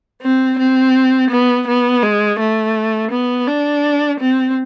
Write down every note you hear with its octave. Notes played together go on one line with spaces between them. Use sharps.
C4
C4
B3
B3
G#3
A3
B3
D4
C4